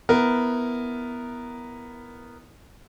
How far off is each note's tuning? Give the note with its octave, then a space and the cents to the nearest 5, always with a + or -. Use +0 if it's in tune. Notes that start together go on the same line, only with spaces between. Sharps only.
B3 +0 E4 +0 A#4 +0